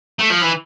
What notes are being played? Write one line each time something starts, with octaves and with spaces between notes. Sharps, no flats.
A3
F3
E3